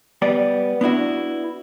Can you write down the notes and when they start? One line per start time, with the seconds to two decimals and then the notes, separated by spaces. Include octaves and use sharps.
0.22 G3 B3 D5
0.81 B3 D4 E4 F#4